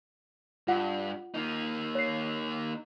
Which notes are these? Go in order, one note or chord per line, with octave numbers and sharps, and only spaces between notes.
G2 F4 F#5
A#3 D#4
C#5 C7